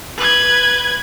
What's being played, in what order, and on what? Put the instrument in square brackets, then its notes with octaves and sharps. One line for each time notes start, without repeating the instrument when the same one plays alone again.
[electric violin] B4 G#6